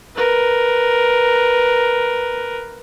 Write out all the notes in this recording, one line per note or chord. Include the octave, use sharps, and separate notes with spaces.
A#4 B4